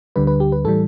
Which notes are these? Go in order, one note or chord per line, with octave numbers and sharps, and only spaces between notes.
D2 D3 G3 B4
B4
G4
B4
A2 E3 G3 A4